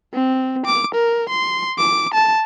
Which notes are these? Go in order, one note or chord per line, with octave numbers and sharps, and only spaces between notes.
C4
D6
A#4
C6
D6
A5